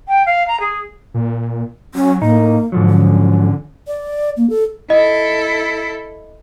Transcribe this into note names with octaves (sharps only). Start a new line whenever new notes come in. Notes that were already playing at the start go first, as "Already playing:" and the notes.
G5
F5
A#5
G#4
A#2
F#3 C#4
A2 A#3 D#4
G#2 D3 F3 F#3
C#4
D5
A#3
A4
E4 A4 D#5